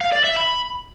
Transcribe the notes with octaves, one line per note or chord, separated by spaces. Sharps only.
F5
D5
E5
B5